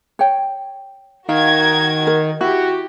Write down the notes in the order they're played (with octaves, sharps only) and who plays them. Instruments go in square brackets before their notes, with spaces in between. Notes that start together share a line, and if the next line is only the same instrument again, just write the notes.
[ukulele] C#5 G5
[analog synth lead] D#3 [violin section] F#4 A#4 G#6 [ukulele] F5
[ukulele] A#4
[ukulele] E4 [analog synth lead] F#4 [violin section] G4